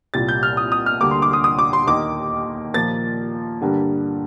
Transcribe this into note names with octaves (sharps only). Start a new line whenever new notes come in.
C2 A#2 G3 A6
G6
F6
D#6
D#6
F6
D2 D3 G3 A#3 D6
C6
D6
D#6
D#6
D6
C6
D#2 D#3 A#3 D6
A#2 F3 A#3 A6
G2 D3 G3 A#3